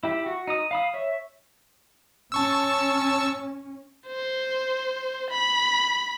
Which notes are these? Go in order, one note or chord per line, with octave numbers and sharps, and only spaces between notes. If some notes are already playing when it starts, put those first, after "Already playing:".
E4 G4
F#4
D#4 D#6
F5 B5 D#6
C#5 E5
C#4 A5 C#6 E6
C5
B5